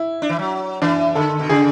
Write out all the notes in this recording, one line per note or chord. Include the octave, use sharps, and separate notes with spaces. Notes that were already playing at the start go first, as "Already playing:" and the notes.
Already playing: E4
D4
E3
F#3
E3 D4
D3 A4
B2
C#3 G#4